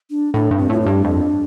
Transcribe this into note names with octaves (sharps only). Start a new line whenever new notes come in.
D4
A2 D4
G2
C4
A2 F4
D4
G2
F2